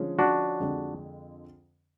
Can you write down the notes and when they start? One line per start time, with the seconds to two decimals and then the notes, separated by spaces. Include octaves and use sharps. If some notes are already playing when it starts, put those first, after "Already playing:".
Already playing: D3 F3 G#3 C#4
0.19 D4 F#4
0.60 F2 D3 G#3